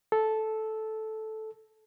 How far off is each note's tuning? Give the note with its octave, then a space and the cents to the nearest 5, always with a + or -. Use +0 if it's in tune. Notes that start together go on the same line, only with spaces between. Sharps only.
A4 -10